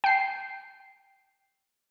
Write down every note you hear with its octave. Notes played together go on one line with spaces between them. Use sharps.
G5 C7